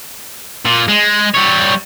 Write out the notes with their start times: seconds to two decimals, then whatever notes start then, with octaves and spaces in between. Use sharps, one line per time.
0.65 A#2
0.88 G#3
1.34 G3 C#5